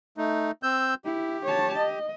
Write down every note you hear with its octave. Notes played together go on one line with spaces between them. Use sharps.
A3 D#4
C4 E6 G6
E4 G4
C#5 A5
D#5